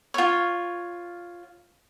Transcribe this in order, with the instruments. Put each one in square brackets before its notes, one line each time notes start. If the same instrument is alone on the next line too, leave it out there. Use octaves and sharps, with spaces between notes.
[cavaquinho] F4 C#5